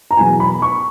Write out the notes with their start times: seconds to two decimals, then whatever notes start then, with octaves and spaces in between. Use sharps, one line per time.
0.11 A#5
0.17 E2 B2 F#3 G#5
0.40 B5
0.62 C#6